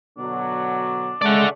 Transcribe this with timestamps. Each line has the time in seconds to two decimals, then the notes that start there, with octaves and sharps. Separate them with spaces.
0.18 B2 D3 F#3 D4
1.22 C#3 G#3 A3 D5 F#5